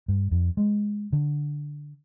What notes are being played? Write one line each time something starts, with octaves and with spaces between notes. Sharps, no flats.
G2
F2
G#3
D3